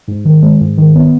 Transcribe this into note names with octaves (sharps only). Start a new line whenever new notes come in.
G#2
D#3
G#3
G#2
D#3
B3